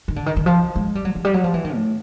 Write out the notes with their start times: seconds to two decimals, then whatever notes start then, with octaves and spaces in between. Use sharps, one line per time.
0.08 D#3
0.16 D3
0.26 D#3
0.37 D#3
0.46 F3
0.76 G#3
0.95 G3
1.05 F#3
1.15 F3
1.25 G3
1.34 F#3
1.44 F3
1.54 E3
1.64 D#3
1.74 A2